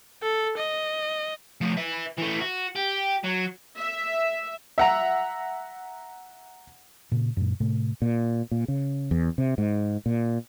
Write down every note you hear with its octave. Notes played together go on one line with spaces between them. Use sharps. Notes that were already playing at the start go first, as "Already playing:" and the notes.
A4
D#5
F3 A3
B4 E5
E3 A3
F#4
G4
F#3
E5
E5 F#5 A#5
A#2 C#3
F#2 A#2
A2 C3 A3
A#2
A#2
C#3
E2
C3
G#2
A#2